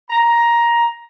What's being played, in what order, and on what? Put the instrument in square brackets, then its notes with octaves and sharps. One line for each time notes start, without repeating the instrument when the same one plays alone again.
[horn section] A#5